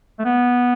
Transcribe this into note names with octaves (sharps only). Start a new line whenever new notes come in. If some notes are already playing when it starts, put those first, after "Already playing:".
A3
B3